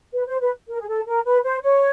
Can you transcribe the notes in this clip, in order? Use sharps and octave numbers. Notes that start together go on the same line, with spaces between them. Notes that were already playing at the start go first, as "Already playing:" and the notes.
B4
C5
B4
A#4
G#4
A4
A#4
B4
C5
C#5